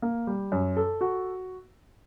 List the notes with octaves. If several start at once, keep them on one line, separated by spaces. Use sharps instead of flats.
A#3
G3
F#2
A4
F#4